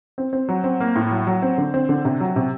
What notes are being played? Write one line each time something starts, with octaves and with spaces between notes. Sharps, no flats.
C4
C4
F#3
C4
A#3
A2
F#3
F#3
C4
D3
C4
D3
C3
F#3
C3